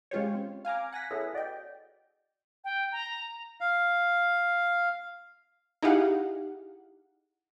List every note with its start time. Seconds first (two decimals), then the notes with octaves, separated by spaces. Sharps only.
0.11 G#3 C#4 F4 G4 C5 C#5
0.35 C4
0.65 F5 G#5 A#5 D6
0.92 F#5 G#5 A#6 B6
1.11 B3 C#4 E4 G#4 A4
1.33 F#4 D5 D#5 G5
2.64 G5
2.92 A#5
3.61 F5
5.83 D#4 E4 G4 G#4 F5 F#5